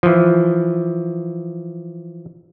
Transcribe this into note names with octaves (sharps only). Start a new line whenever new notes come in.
E3 F3